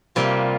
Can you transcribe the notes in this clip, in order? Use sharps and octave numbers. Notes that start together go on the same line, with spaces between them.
C3 G3 A#3 F4